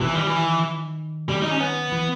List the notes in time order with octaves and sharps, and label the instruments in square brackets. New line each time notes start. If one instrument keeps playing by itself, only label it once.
[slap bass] D#3 [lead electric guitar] E3
[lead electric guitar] G3
E3
G3
D#4
C#4
B3
[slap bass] E3